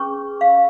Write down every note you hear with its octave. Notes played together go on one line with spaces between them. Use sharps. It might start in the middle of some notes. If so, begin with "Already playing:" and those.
Already playing: C#4 G#4 B4 C#6
F5